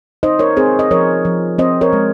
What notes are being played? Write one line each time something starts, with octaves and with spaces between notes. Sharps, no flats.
D#4 C5 D#5
A#4 C#5
C4 G#4 C5
D#5
F3 A#4 C#5
F3
C4 C5 D#5
A#4 C#5
G#3